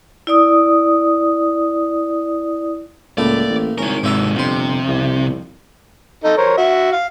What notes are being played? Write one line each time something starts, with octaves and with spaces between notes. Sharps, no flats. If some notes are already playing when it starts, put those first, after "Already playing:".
E4 D5 D#6
C#2 A2 A3 A#3 D5
A1
G#1 C#4 E4 A#4
G#2 C3 D4 E5 A#5
G1 F2 C3 C5
C2
D#4 A4 D#5
A#4 C5 C#5
F#4 E5
F5